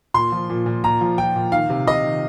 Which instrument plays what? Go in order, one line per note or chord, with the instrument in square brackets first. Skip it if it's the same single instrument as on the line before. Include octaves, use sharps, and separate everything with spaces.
[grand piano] A#2 C6
F3
A#2
A#2
A#2 A#5
F3
F3 G5
A#2
D#3 F5
C3
C3 D#5
D#3